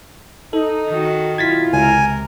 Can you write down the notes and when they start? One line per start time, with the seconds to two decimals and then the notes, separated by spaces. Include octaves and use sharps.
0.53 D#4 A4
0.89 D#3 F#4
1.38 B1 E4 F4 G#6 A6 B6
1.73 C#2 C3 A#4 G#5